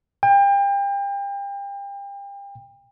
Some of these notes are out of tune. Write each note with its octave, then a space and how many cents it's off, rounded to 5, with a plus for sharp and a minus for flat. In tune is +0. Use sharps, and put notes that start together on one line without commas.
G5 +35